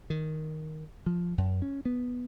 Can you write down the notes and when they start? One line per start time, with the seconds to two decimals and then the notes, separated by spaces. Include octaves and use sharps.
0.10 D#3
1.06 F3
1.38 F#2
1.62 C#4
1.85 B3